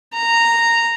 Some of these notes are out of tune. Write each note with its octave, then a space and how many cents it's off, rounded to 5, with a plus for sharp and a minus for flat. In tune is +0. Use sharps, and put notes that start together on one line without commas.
A#5 -10